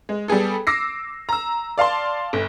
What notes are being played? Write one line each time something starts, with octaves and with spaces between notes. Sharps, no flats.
G#3
G3 B3 G#4 A4
D6 E6 A#6 C7
A#5 E6
D5 F5 A5 C6
G1